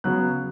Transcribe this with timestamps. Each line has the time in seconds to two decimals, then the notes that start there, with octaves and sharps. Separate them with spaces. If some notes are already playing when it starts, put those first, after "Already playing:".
0.04 C#3 F#3 B3 F#6